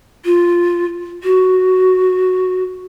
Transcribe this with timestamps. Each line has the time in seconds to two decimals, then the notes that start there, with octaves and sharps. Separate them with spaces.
0.25 F4
1.24 F#4